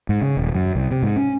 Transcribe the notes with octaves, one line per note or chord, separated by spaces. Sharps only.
G#2
C#3
D#1
F#2
C2
C3
G#2
C#4